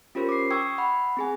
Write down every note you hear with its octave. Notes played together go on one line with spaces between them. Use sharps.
C#4 F4 G4 A#4 C5
D6 C7
G5 C#6 D#6 E6 G#6
F#5 B5
C4 G#4 G#5